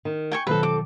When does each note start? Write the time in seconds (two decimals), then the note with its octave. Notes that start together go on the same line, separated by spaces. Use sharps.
0.05 D#3
0.32 G5 G#5 C#6
0.47 F2 B2 D#3 F#3 C4 A4 B4
0.63 D6